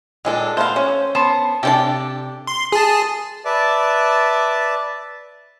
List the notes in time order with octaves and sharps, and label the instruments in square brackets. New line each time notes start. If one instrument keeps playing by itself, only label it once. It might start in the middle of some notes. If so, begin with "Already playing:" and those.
[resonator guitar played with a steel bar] A#2 A4 [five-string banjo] D#3 G#3 D4
[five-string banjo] A3 B3 F5 [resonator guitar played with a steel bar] C5
[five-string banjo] C#4
[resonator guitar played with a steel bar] B3 C5 A5
[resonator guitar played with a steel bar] C3 D4 [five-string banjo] G4 A4 A5
[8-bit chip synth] C6
G#4 A5
[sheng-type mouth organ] B4 D5 E5 A5 D6